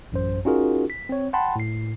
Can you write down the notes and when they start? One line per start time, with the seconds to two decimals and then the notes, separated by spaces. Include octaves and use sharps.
0.12 A1 F#2 C5
0.45 C#4 D#4 F4 F#4 G#4 A#4
0.90 B6
1.09 C4 C#5
1.33 F#5 G5 A5 B5 C6
1.56 A2 C7